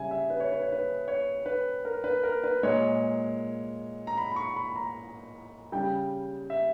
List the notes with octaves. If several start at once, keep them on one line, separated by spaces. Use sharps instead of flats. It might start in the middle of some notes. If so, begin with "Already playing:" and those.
Already playing: C#3 G3 E5 G#5
E5
B4
C#5
B4
C#5
B4
C#5
B4
A#4
B4
A#4
B4
A#2 G#3 C#5
A#5
B5
B5
C#6
B5
A#5
C#3 G3 G5
E5